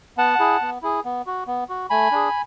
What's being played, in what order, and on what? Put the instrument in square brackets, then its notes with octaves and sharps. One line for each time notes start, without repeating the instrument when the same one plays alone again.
[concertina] B3 F#5 A5
E4 G#4
B3
E4 G#4
B3
F#4
B3
F#4
A3 G#5 B5
D4 G#4